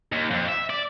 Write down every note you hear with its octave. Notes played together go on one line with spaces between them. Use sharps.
D#2
F2
E5
D5